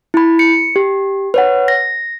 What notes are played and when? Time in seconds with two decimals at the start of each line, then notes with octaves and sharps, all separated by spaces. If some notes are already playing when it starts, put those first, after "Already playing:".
0.14 E4 B5
0.39 C#7
0.76 G4
1.34 B4 C#5 F#5
1.68 A#6